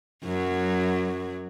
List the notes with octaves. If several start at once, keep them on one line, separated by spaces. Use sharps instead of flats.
F#2 F#3